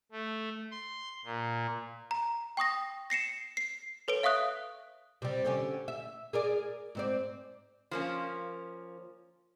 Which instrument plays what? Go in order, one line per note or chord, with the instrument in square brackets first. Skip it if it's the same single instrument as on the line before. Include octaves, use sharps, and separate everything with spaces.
[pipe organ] A3
C6
A#2
[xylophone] A#5
G5 C#6 D#6 A#6
A#6 C7 C#7 E7
C7
A4 B4 C#5 D7
E5 F5 C#6 D#6 F#6
[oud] C3 G3
D3 C#4 G4
E5
G#4 A#4 D5
G#2 C4 D5
[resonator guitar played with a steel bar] F3 A#3 C#4